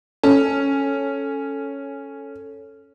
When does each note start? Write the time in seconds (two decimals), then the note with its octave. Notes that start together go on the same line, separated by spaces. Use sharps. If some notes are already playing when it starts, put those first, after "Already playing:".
0.24 C#4 A4